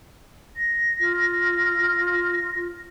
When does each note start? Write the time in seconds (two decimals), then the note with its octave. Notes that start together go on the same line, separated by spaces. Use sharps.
0.57 A#6
0.99 F4